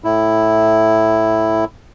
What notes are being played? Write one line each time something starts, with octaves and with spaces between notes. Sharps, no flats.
A2 E4